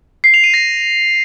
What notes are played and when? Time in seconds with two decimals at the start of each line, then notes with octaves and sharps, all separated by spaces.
0.24 C7
0.34 F7
0.44 D#7
0.54 A#6